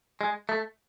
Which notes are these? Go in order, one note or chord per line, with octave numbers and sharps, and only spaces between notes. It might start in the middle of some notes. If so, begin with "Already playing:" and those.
G#3
A3